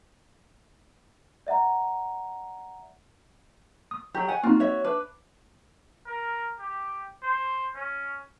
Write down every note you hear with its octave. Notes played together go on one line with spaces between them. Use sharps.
D5 E5 F#5 A#5
D#6
F#3 G4
F#5 G#5
A#3 C4 D#4 F4 F#4
C#5 E5
D4 B4
A#4
G4
C5
C#4